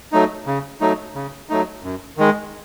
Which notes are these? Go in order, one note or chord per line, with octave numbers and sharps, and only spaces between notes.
F#3 A3 D#4
C#3
F#3 A3 D#4
C#3
F#3 A3 D#4
F#2
D#3 G#3